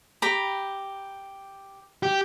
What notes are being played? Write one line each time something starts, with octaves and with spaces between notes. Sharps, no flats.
G4 A#5 B5
G4